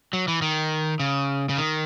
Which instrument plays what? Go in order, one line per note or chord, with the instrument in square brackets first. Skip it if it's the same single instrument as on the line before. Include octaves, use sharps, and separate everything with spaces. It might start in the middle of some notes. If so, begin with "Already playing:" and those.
[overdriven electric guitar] F#3
E3
D#3
C#3
C#3
D#3